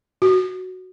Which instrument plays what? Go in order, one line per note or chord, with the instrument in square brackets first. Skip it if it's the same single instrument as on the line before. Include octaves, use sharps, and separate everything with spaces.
[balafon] F#4